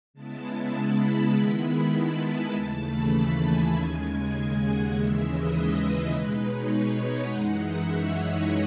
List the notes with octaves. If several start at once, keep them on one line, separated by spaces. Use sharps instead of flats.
C#3 G#3 B3 E4 A5
A5
B5
D#3 G#3 B3 E4
A5
G#5
D#2 C#3 E3 A3 A5
B5
A5
G#5
D#2 C#3 G#3 G#5
G#5
G#5
F#5
D#2 C#3 E3 G#3 E5
D#5
B4
B4
B2 G#3 D#4 B4
C#5
F#5
F#2 E3 G#3 D#4 F#5
E5
C#5
D#5